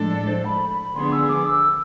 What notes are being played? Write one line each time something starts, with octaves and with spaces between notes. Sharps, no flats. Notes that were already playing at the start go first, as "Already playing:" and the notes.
Already playing: A2 F3 G#3 D4 A4
D5
C5
B5
B5
D3 F3 B3 D4 G#4 C6
E6
D6
E6